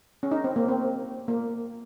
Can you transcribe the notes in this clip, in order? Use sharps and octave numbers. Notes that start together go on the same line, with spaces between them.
C#4
D#4
C4
A#3
C4
A#3